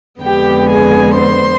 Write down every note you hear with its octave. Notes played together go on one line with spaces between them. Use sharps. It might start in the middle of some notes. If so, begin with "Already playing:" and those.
F2 D3 G#3 B3 G4 G5
G#4 G#5
C5 C6